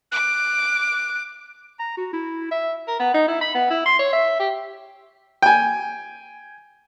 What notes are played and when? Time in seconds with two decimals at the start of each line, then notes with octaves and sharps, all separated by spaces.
0.12 D6 F#6
1.79 A#5
1.97 F#4
2.13 E4
2.51 E5
2.88 A#4
3.00 B3
3.14 D#4
3.28 E4
3.41 B5
3.55 B3
3.70 E4
3.86 C6
3.99 C#5
4.13 E5
4.40 G4
5.42 G5 G#5